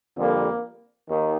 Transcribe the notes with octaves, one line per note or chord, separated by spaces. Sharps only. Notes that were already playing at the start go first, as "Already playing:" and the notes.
F2 D3 G3 A#3
D#2 D#3